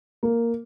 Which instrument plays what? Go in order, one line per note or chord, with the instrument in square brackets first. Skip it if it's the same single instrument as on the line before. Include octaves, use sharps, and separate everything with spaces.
[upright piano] A#3